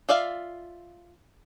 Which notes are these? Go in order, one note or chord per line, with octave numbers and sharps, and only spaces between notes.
F4 D5 E5 F5